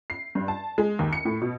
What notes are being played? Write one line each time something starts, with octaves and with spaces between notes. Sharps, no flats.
C7
G2
A5
G#3
D#2
C#7
A2
B2